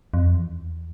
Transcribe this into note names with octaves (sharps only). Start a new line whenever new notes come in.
F2
E2